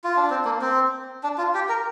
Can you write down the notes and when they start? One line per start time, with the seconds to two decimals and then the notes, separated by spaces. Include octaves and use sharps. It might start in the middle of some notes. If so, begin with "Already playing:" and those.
0.04 F4
0.17 D4
0.30 C4
0.45 A#3
0.62 C4
1.23 D4
1.38 F4
1.55 G4
1.69 A#4